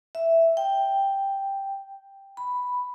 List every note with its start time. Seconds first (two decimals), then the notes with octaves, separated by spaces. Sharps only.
0.15 E5
0.57 G5
2.37 B5